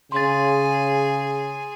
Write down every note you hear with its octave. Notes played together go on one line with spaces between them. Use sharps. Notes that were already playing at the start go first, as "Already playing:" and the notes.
C#3 G#4 C6 A6